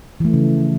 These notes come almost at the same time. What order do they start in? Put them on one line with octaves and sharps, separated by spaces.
E3 A3 F3 C#3